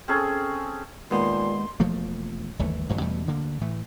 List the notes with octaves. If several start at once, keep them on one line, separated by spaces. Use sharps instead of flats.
C4 C#4 G#4 A4
D#2 A#2 G#3 B3 C6
E1 F3 A3 A#3
G1 D#2 E3 A3
A1 G2 D3 F#3
E2 B2 G3 A3
D2 D3 A#3
A2 E3 A3